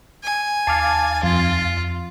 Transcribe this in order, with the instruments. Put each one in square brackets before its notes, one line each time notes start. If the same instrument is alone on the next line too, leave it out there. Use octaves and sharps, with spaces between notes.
[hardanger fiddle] G#5
[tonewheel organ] D#2 F5 A6 [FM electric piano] A5 D6 F6
[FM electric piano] F2 [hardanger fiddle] F4